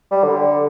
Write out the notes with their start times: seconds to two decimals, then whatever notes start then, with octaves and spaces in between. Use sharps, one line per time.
0.11 G3
0.24 D3